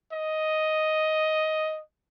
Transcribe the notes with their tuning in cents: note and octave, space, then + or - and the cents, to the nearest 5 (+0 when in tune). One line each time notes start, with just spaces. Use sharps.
D#5 +5